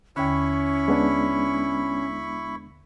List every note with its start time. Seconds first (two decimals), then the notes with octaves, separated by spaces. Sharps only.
0.16 D#2 D3 C#4 E4 B5 C#6
0.88 G#3 B3 D4